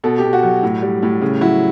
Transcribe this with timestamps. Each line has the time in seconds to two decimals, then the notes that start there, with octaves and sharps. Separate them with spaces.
0.04 B2 A4
0.18 B2 G4
0.33 F#4
0.43 F#3
0.63 A2
0.82 G3
1.03 A2
1.21 C#3
1.41 F#3 E4